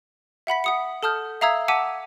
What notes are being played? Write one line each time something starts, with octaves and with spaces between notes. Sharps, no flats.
E5 F#5 B5 B6
F#5 D#6 C#7
A4 A5 D#6 F6 G6
E5 F5 A#5 D#6 E6 G#6
F#5 A5 D6 E6 B6 D#7